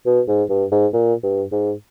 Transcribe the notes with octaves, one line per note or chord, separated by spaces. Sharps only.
B2
G#2
G2
G#2
A#2
G2
G#2